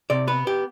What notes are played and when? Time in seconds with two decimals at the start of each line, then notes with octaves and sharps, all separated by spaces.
0.10 C3 D5
0.27 B3 B4
0.47 G4